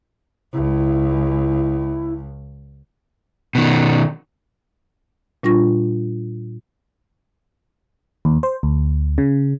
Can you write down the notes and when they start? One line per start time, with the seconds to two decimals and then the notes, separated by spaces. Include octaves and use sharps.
0.53 C#2 E4
3.55 B2 D#3
5.43 A#2 G3 D4 F4 C#6 A#6
8.25 D#2
8.43 C5
8.63 D2
9.18 C#3